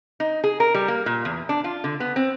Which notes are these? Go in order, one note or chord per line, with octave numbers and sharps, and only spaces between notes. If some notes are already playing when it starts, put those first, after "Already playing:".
D#4
G#4
A#4
G3
A#3
A#2
E2
D4
F4
D3
B3
C4